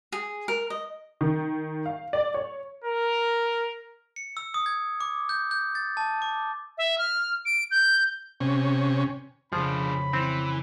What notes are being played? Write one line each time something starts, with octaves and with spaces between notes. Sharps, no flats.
G#4
A#4
D#5
D#3
F5
D5
C#5
A#4
C#7
E6
D#6
G#6
D6
G6
G6
A6
A5
D6
E5
F6
D7
G6
C3 C#4
F2 C#3 F3 D4 G#4 B5
E3 C4